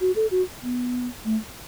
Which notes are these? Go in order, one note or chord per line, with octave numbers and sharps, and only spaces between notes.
F#4
A4
F#4
B3
A3